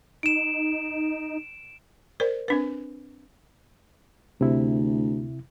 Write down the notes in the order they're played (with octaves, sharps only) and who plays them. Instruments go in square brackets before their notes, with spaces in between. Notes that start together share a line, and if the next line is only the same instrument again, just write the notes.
[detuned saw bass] D#4 [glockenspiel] D7 E7
[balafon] A#4 C5 D5
C4 D4 B4
[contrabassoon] D2 [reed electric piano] C3 E4